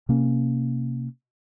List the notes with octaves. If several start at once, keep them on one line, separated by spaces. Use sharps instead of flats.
C3 A#3 C#4